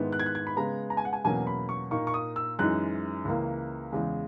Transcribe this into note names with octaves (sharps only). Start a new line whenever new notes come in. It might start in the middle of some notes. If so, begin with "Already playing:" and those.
Already playing: G#2 D#3 G#3 B3 E4
F#6
G#6
F#6
G#6
B5
C#3 G#3 B3 A#5
A#5
G#5
F#5
G#5
E2 B2 F#3 A#3 C#4 G#5
B5
C#6
A#2 A#3 D#4 C#6
C#6
D#6
E6
F#2 E3 G#3 D#4 F#6
C#2 C#3 E3 A#3
E2 C#3 G#3